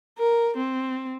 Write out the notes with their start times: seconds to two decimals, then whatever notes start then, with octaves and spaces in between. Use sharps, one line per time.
0.18 A#4
0.57 C4